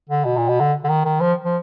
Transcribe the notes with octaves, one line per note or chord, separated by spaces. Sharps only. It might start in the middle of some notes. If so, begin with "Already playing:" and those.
D3
B2
A#2
B2
D3
D3
D#3
D#3
F3
F3